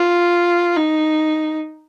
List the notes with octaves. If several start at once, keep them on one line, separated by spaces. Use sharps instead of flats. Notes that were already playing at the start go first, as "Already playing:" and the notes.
Already playing: F4
D#4